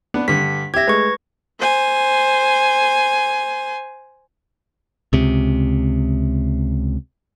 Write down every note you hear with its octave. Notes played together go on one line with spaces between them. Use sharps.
B3 D4 B4
G2 D3 B6
G4 E5 G#6 A#6
G#3 A3 B4 C#6
C5 G#5
C#2 C3